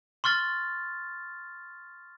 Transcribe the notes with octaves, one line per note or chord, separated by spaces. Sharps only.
C6 C#6 F6 A6